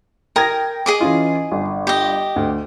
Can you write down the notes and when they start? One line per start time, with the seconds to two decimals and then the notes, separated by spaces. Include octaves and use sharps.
0.36 A#4 G5 D#6 G#6 A#6
0.86 G#4 D#5 D6
1.00 E3 C#4 F4
1.51 G1
1.87 G4 D#5
2.36 D2